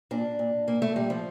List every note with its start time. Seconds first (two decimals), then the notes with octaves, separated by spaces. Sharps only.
0.11 A#2 D4
0.39 A#2
0.67 A#2 A#3
0.82 A3
0.96 A#2 G3
1.10 F3